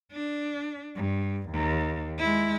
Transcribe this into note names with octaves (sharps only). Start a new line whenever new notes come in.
D4
G2
D#2
G#3 E4